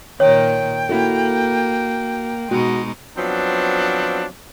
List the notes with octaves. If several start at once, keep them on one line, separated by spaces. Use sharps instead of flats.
A#2 D#3 C#5 G5
A#3 E4 F#4 A4
B2 G#3 D#4 F#4
F3 F#3 B3 C4 D4